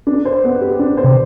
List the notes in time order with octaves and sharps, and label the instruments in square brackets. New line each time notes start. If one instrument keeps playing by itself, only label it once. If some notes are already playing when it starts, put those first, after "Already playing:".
[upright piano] D4
C5
B3
G4
D4
C5
[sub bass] C3